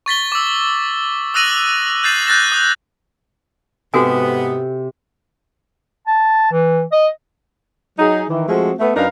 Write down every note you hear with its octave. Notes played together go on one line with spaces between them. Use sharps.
C#6 A6 B6 G7
D6 E6
D#6 E6 F#6 A#6 D#7 F#7
F#6 G6 A6 C7 E7 F#7
F#6 G6 A6 A#6 E7
D#6
G#2 C3 B3 F#4 A4 G#5
A5
E3
D#5
F#3 D#4 G#4
D#3 E3
F3 G#3 A3 C4 F4 F#4
A3 B3
F#2 D4 D#4 A#4 B4 F5